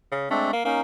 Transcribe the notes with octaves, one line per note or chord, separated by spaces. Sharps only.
C#3
G#3 A3 C4 D4
A#3
A#3 C#4 D#4